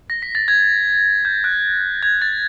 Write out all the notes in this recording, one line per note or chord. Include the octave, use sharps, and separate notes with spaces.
A#6
B6
A6
G#6
G6
F#6
G#6
A6